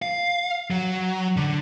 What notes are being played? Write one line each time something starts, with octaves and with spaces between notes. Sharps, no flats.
F5
F#3
D3